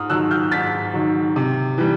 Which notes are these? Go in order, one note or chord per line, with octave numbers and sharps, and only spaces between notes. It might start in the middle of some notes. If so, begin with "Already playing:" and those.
Already playing: G#2 D#6 F6
D#3 F#3 E6 F#6
F6 G6
G#2 A6 B6
D#3 F#3
C3
E3 G3